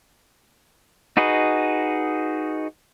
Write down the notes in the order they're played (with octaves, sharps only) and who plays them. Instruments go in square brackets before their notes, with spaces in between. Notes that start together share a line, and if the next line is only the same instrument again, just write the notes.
[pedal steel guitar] D#4 F#4 G#4 B4 D#5